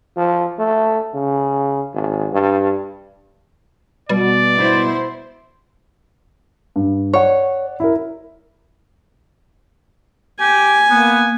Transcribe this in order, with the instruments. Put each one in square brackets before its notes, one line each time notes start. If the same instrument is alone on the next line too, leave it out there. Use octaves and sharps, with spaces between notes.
[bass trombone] F3
A3
C#3
G#1
G2
[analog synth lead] B2 [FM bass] G3 [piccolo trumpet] D5
[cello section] B3 E4 C5
[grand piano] G2
[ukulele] C#5 [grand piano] D5 F#5
[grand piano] E4 A#4
[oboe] G4 [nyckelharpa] G#5
[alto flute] A#3 [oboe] B3